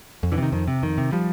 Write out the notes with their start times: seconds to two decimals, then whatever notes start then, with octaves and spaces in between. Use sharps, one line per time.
0.23 F2
0.32 D3 E3
0.38 C3 D#3
0.52 F2 D#3
0.68 C3
0.83 F2 D#3
0.98 C3
1.12 F3 G3